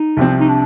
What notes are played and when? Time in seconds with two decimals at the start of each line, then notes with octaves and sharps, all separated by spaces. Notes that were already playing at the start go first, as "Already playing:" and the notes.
Already playing: D#4
0.17 C2 C3 F3 C4
0.40 D#4
0.49 D4